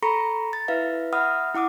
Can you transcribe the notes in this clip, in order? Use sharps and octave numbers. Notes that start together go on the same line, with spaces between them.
A4 A#5 B5 C#6 A#6 C#7
A6
E4 B4 E5 F5
E5 F#5 B5 D#6 F6
E4 F#5 D6 D#6